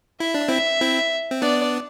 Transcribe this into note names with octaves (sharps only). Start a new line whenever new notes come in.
E4 E5
D4
C4 E4 E5
C4 E4
C4
B3 D4 D5